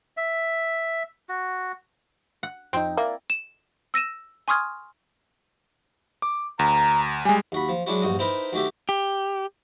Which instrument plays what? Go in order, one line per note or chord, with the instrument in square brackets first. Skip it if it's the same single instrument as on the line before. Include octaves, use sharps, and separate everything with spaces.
[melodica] E5
F#4
[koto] F#5
[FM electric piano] F2 D#4 [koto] C4 G5
[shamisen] A#3 [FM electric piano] E4 D5
[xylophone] E7
E6 A#6 D#7 E7
G#5 C6 C#6 D#6 F6 G#6
[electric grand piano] D6
[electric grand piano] D2 [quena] A#5
[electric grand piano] G3 G#3 [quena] G#5
[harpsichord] D#2 F#4 B5
F3
F#3 G#3 D4 E4 F#4
A#1 G2 F#4 D#5
C4 D#4 E4 A#4 B4
D2 D#3 F#4 G4 E5
[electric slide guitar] G4